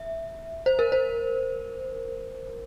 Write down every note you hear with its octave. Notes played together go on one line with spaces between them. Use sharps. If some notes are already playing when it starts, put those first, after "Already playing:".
Already playing: E5
C5
A#4
C5